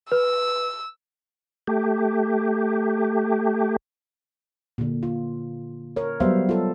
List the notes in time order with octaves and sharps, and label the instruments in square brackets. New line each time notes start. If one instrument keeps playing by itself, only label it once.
[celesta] B4 [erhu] E6
[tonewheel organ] A3 G4
[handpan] A#2 D3
F4
A#4 C#5
F#3 G3 B3 C5 E5 F5
F4 A4